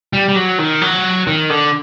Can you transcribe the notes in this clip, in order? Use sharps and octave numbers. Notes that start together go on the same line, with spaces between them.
G3
G3
F#3
D#3
F#3
D#3
D3